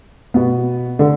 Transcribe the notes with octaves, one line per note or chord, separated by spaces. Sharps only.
B2 B3
D3